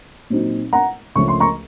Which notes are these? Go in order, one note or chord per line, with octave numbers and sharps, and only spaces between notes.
A#2 F#3 C4 D#4
F#5 A#5
C#2 C#3 F3 A3 C#4 C#6
C6
A#5 C#6